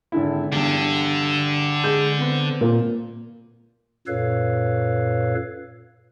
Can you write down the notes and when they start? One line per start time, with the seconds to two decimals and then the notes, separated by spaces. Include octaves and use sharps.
0.12 G#1 D3 E4
0.53 E2 G2 D3
1.84 G#3 G6
2.19 B3 C4
2.61 A#2
4.07 F#2 A#2 A4 B4 C#5 F5